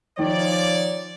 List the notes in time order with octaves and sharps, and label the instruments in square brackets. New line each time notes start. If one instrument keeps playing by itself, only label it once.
[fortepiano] D#3 [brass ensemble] F3 C#5 D5